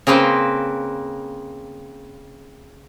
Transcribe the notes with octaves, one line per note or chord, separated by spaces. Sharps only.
C#3 A#3 C4 B4 C5